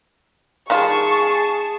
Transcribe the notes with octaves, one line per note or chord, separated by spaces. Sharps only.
D#3 G3 F4 G#4 A5 C#6